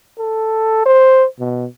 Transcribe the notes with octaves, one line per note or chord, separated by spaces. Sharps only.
A4
C5
B2